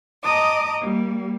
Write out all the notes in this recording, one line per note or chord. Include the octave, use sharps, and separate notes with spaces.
D#5 A5 A#5 D6 D#6
G3 A#3